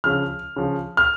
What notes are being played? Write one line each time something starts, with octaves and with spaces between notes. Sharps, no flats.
C#3 F3 F6
C#3 F3
F6